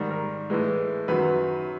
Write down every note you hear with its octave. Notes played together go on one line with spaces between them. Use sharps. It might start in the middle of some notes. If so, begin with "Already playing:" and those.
Already playing: G#2 D#3 G3
A#4
A2 E3 G#3
F#2 D#3 F#3 B4